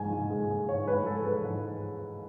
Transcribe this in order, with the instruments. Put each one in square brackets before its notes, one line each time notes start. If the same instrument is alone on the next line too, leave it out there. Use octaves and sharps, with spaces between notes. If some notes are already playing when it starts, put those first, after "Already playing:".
Already playing: [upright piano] G#2 G#3 G#5
G#2
G#3
G#3
G#2 C#5
G#2 B4
G#3 A4
G#3 B4
G#2